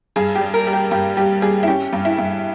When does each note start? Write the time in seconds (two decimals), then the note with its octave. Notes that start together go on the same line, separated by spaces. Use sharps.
0.16 G2 G#4
0.35 G4
0.41 G3
0.54 A#4
0.67 G3
0.73 G4
0.91 G2 G4
1.17 G3 G4
1.42 G3 G#4
1.63 E4
1.67 C#4 G4
1.93 G2
2.05 E4
2.18 G2